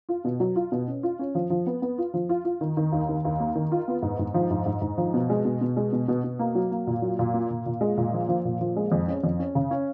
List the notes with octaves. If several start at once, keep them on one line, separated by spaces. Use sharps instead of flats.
F4
B2
F#3
F4
B2
C#4
F4
C#4
F3
F3
B3
B3
F4
F3
F4
F4
D#3
D#3
D#2
D#3
D#2
A#3
D#3
F4
B3
G#2
G#2
F3
G#2
G#2
G#2
F3
B2
G#3
B2
B2
G#3
B2
B2
B2
A#3
F#3
A#3
A#2
F#3
A#2
A#3
A#2
A#2
G#3
A#2
F3
F3
A#2
F3
G#3
F2
C#4
F2
C#4
C#3
C#4